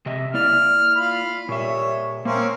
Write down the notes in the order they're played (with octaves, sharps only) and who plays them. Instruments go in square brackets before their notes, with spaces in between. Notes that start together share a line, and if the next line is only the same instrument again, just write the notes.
[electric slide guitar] C3 D#5 E5
[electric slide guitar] A#3 E4 D5 [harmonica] F6
[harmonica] F4 B5
[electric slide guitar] A#2 E5 [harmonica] G3 C#5
[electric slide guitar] A#3 [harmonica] C4 C#4 A#4